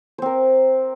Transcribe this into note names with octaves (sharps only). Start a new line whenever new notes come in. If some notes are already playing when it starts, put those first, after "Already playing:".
C4 A#4 C5